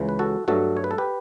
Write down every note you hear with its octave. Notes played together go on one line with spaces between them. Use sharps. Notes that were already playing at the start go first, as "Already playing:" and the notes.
Already playing: C#2 C#3 E3
B4
F#4 A4
G2 F#3 A3 F#4 A4
C#5
B4
A4
G4 B4